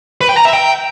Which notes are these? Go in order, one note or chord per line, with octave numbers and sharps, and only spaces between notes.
B4
G5
A#5
E5
G5